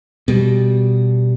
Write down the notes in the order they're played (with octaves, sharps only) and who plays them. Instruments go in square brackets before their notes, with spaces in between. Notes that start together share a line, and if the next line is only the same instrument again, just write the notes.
[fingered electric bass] B2 G3